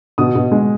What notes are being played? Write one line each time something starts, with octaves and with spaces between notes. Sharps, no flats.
B2 D#6
B2
G#3